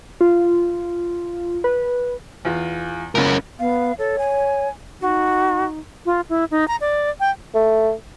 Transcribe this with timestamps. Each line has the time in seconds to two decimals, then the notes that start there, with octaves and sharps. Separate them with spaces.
0.21 F4
1.64 B4
2.45 E2 F4
3.15 F#1 C#2 C#4 A#4
3.59 B3 F5
3.98 A4 C#5
4.19 G#5
5.01 D#4 F#4
6.06 F4
6.29 E4
6.51 D#4
6.68 A#5
6.81 D5
7.20 G5
7.54 A3